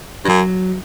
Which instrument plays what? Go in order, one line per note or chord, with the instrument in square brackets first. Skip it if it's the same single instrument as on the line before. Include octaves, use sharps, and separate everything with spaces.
[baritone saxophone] G2
[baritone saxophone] F#2 [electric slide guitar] F#3